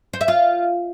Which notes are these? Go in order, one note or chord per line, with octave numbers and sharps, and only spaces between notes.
C5
E5
F4